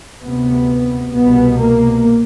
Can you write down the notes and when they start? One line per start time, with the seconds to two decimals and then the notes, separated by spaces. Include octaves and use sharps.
0.24 D2 C3 B3
1.13 C2 B2 B3
1.58 A#3